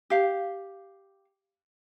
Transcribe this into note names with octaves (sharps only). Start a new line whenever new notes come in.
G4 F5